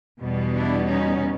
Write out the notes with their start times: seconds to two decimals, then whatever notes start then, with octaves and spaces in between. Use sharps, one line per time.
0.20 E2 B2 G3 B3
0.53 D4 E4
0.85 C#4 D#4